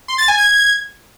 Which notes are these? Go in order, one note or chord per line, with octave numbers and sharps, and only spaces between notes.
C6
A6
G#5
G#6